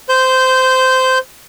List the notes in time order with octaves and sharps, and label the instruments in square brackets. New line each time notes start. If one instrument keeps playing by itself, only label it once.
[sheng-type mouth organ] C5 G6